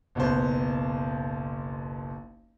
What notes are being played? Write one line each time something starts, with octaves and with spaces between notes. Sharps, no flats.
F#1 B1 B3 C5